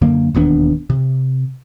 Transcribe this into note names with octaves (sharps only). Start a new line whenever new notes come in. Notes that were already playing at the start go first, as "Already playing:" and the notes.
F#2 D3 A#3
E1 D#2 B3 D4
C3